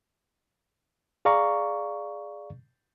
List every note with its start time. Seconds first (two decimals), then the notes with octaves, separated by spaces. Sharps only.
1.25 G#4 D5 F5 A#5 C#6